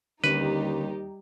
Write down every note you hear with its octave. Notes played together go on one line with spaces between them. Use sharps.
D#2 D3 G3 C#4 D#4 G4 B4